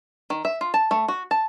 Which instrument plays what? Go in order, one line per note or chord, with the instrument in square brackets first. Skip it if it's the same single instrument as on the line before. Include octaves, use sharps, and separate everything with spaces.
[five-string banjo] D#3
E5
F4
A5
A3
F#4
A5